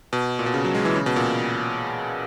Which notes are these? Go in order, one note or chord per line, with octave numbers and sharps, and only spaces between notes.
B2
A#2
B2
C#3
F#3
G#3
E3
C#3
B2
A#2